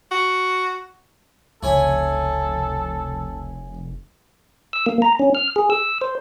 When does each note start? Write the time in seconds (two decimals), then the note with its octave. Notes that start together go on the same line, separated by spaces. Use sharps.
0.12 F#4
1.63 F1 C#2 E4 A4 C#5 G#5
4.73 E6
4.86 A#3
5.02 A#5
5.19 C#4
5.35 F6
5.56 G#4
5.70 E6
6.01 C5